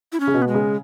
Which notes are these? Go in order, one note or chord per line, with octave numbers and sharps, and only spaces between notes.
E4
C#4
C#3
B2
B3
G#3
C#3